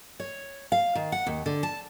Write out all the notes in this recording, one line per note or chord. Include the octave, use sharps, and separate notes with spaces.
C#5
F5
D#3
F#5
D#2
D3
A5